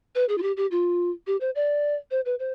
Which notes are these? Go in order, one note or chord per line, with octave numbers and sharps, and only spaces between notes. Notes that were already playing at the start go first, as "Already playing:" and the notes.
B4
G#4
F4
G4
G4
F4
G4
C5
D5
C5
B4
C5